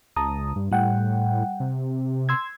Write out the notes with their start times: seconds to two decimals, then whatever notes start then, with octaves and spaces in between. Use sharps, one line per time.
0.16 C#2 A5 A#5 D#6
0.56 G2
0.71 A2 G3 F#5 G5
1.60 C3
2.29 C6 E6 G#6